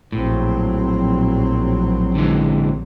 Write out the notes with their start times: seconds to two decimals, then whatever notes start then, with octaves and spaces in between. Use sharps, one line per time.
0.12 A#1 A2 F#3 C4
2.15 D3 E3 G#3